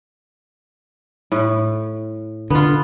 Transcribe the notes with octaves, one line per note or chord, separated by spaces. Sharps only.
A2
D3 B3 F4